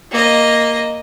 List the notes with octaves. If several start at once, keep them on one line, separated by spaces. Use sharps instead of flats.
A#3 D#5